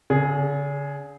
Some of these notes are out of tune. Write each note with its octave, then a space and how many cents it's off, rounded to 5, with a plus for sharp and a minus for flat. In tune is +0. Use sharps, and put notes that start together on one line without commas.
D3 -45 G#4 +0